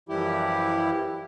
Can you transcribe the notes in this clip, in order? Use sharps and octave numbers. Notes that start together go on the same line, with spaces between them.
F#2 E3 F3 G3 E4 G4